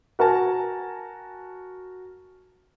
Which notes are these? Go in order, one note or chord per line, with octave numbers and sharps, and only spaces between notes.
F#4 A#4 G#5 A5